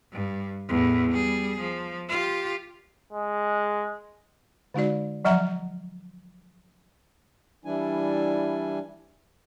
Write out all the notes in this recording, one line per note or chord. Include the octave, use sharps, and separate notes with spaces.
G2
E2 A2
G3 G#4
F3
F4 G4
G#3
D3 G#3 D#4 F#4 D5
F3 F#3 E5 F#5 A#5
E3 G3 D4 E4 G#5